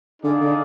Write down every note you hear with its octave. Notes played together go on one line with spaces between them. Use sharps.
D3 D#4 G#4 D5 F5
D3